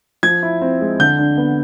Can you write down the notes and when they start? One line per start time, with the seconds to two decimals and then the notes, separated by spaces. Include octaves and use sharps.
0.23 F3 G#6
0.43 E4
0.61 C4
0.81 G#3
1.00 D3 G6
1.19 D4
1.37 B3